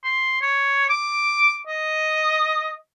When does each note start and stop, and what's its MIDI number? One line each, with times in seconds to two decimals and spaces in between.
0.04 0.39 84
0.42 0.88 73
0.90 1.56 86
1.67 2.73 75